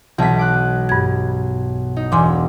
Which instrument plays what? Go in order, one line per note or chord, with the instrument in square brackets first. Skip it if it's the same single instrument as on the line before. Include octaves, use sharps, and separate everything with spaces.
[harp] B1 B6 [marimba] E3 A5
[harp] D6 F#6
[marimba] G2 G#6
[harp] D#4
[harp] E1 [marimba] G#5 C6 D6